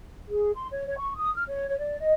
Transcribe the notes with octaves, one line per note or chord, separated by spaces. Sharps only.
G#4
C6
C#5
C#5
C#6
D#6
F6
C#5
C#5
D5
D#5